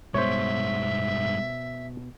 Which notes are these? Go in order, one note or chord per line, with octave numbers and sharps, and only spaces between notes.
G2 B2 G#3 B3 C5 C#5 E5